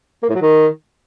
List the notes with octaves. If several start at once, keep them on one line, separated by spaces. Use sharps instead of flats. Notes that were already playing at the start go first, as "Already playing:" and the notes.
A#3
A2
F#3
D#3